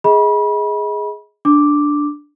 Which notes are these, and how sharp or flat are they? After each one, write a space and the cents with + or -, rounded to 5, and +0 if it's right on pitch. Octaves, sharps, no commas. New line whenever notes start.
G#4 +0 D#5 +30 B5 -30
D4 +0 D6 +0